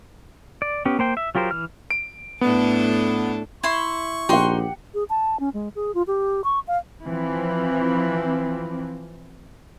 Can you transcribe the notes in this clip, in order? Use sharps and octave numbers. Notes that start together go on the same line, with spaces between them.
D5
B3 C#4 G4
A#3 C5 G5
E5
F#3 F4 G4 A#4 C5
E3 F6
D7
A2 B3 D4 A4
E4 C6 C#6
A#1 D#4 G4 F#5 C6
G#4
A5
C#4
G#3
G#4
F4
G4
C#6
F5
E3 F3 C4